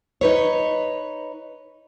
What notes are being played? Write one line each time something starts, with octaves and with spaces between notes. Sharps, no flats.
D#4 B4 C#5